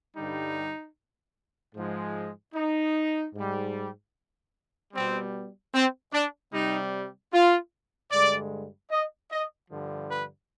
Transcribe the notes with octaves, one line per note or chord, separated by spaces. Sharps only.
G2 D3 G3 D#4
G#2 F3 G#3
D#4
G#2 G3
B2 G3 C4
C4
D4
C3 G3 D#4
F4
G2 D3 G#3 D5
D#5
D#5
G2 D3 F3
B4